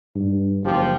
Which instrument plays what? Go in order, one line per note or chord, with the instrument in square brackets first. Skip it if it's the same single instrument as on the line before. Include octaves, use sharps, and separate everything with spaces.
[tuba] G2
[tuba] F#1 [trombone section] F3 G4